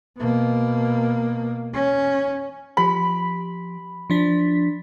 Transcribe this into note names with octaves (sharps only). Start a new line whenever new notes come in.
B2 A#3
C#4
F3 G4 B5
F3 D4 B6